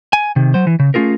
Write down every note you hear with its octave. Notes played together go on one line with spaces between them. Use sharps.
G#5
C3 D#3
F#3 C5
E3
C#3
A3 C#4 F4 G#4 A#4